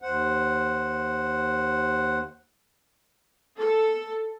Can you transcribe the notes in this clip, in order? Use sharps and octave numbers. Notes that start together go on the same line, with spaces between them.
D#2 C5 F#5
A4